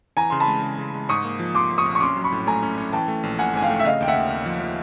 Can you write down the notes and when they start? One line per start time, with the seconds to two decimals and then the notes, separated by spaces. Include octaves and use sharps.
0.17 E3 G#5 A#5
0.30 C#3 C6
0.40 A5 B5
0.48 G#3
0.63 C#3
0.78 C#3
0.94 G#3
1.09 G#2 C#6 D#6
1.24 A#3
1.39 F3
1.55 F3 C6 D6
1.71 F3
1.78 C#6 D#6
1.86 A#1
1.95 C#6
2.00 C#4 C6 D6
2.16 F#3
2.24 B5 C#6
2.32 A2
2.46 A3 G#5 A#5
2.63 C#4
2.78 C#4
2.92 E3 G5 A5
3.08 A3
3.23 A#1
3.39 A#1 F#5 G#5
3.54 G#2 G#5
3.62 F5 G5
3.70 A3
3.79 E5
3.84 C#3 D#5 F5
4.01 D#2 G5
4.08 E5 F#5
4.16 D#2
4.30 D#2
4.46 F3
4.61 F3